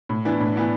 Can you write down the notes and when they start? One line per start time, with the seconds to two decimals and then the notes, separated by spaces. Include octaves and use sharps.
0.09 A2
0.25 E3 B3 D4
0.40 A2
0.56 E3 B3 D4